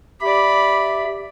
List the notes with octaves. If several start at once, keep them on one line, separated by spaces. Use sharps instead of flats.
G4 D5 E5 B5